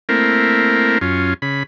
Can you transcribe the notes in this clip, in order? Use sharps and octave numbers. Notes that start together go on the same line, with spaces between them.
A3 A#3 C4 E4 A#4
F#2 C#4 F4
C#3 B5